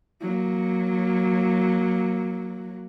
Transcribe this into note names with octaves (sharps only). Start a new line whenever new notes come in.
F#3 A#3